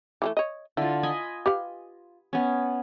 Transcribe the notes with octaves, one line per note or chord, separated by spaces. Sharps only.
E3 G#3 A3
C#5 D#5
D3 E4 F4
D#5 G#5 B5
G4 B4 F5
B3 C#4